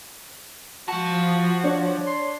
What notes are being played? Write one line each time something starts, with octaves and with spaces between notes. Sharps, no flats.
F3 F#4 A5
D4 C#5 D5
C6